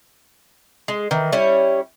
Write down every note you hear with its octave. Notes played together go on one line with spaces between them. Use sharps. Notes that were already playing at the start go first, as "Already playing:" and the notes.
G#3
D#3 E3
G3 C#4 E4 C#5